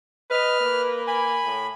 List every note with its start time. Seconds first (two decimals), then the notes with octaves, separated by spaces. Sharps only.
0.31 B4 D#5 F6
0.61 A#3
1.08 G#5 B5
1.43 A2